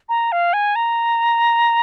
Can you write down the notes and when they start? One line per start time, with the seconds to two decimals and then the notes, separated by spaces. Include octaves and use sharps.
0.09 A#5
0.32 F5
0.53 G#5
0.76 A#5